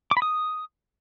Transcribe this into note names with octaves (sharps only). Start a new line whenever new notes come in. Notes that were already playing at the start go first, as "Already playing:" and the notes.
D6
B5
D#6